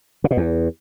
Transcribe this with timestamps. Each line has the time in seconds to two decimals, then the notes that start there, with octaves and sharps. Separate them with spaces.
0.24 C#3
0.31 B2
0.37 E2